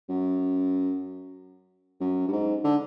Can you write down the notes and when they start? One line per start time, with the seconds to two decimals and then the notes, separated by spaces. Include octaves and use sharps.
0.09 F#2
2.01 F#2
2.28 G2
2.32 G#2
2.64 D3